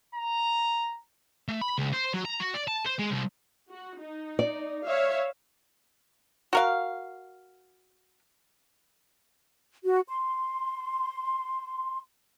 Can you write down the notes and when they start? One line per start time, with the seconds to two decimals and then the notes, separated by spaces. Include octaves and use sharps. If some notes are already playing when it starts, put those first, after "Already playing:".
0.15 A#5
1.49 A3
1.61 B5
1.78 C#2
1.93 C5
2.14 F#3
2.25 A#5
2.40 F#4
2.54 D5
2.68 A5
2.86 C5
2.99 G#3
3.11 C2
3.69 F#4
4.00 D#4
4.39 D5
4.85 C#5 E5 F5
6.53 F#4 A#4 F5
9.84 F#4
10.08 C6